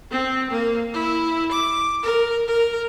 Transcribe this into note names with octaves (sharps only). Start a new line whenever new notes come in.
C4
A#3
E4
D6
A#4
A#4